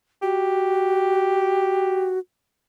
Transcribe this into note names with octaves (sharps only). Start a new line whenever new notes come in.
F#4 G4